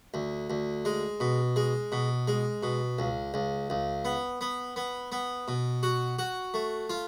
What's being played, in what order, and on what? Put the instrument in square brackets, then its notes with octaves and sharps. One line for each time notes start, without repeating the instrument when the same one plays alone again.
[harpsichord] D2
D2
G#3
B2
G#3
B2
G#3
B2
C#2
C#2
C#2
B3
B3
B3
B3
B2
F#4
F#4
A3
F4